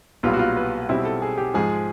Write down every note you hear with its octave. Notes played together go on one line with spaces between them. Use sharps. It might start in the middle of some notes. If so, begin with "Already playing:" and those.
B1 A#2 G3 B3 F4
F#4
F4
B4
B1 B2 G3 C4 E4
A4
G#4
G4
G#2 F3 G#3 G#4